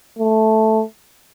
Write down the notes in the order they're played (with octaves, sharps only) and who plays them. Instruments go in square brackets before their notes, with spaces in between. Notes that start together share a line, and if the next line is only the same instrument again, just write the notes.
[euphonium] A3